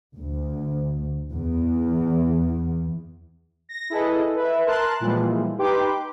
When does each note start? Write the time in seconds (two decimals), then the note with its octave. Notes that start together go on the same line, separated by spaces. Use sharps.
0.16 D2
1.31 E2
3.69 A#6
3.90 E4 G#4 A4 B4 D#5
4.36 B4 E5
4.67 A#4 A5 C6 F#6
5.00 A#2 E3 F3 G3 G#3
5.58 D#4 G4 B4 G5 C6 D6